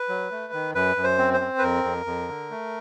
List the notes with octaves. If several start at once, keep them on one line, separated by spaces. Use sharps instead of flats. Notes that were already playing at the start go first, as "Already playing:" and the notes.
Already playing: B4
F#3
A3
D#3
F#2 B4
F#2
C5
C4
C5
C4
B4
F2 A#4
F2
F2
D3
A3